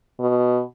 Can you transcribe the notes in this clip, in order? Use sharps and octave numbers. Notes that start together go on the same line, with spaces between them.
B2